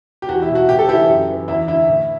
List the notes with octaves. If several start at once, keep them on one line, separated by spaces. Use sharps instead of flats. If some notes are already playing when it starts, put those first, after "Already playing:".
G4
E2 F#4
E4
B2
F#4
A2 G4
A4
E3 E4 G4
F#2
E3
E2 E4
D3 E4
A2